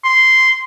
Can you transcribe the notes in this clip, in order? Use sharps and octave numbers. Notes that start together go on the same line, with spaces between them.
C6